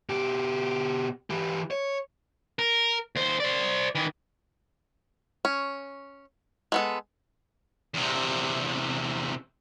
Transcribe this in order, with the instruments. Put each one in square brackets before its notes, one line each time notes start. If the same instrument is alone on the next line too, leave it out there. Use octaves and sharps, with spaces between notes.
[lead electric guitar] B2 G4
E3 G4
C#5
[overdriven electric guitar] A#4
D#2 C5
C5 D5
D#3 E3
[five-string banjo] C#4
G#3 B3 A4
[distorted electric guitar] E2 C3